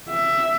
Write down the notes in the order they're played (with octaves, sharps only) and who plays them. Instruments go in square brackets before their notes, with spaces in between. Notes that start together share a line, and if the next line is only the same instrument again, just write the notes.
[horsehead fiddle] E5